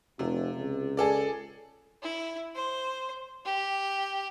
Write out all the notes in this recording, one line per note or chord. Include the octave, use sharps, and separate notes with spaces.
F1 C3
C#2
G#4 A4 D5
E4
C5
G4